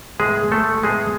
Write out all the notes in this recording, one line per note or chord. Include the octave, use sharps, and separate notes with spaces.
A2 G#3 B3 G#4
A3 A4
A2 G#3 B3 G#4